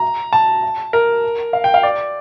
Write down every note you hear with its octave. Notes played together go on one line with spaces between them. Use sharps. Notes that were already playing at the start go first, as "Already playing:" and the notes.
Already playing: A#5
A5
A#4
F5
G5
F5
D5